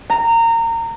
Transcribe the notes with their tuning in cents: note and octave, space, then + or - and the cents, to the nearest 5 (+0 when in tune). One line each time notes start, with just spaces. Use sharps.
A#5 -25